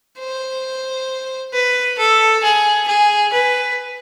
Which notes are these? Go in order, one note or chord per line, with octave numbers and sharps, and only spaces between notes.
C5
B4
A4
G#4
G#4
B4